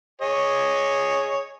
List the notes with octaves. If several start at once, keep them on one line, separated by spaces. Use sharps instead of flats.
G#4 C#5 D#5